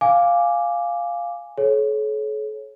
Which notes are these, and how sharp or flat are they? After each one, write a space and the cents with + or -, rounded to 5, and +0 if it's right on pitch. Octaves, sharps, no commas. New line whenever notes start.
F5 +0 G#5 -5 D6 +0
A4 -45 C#5 -10